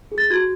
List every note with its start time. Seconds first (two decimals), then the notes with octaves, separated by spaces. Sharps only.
0.12 G#4
0.18 A6
0.30 F#4 G#6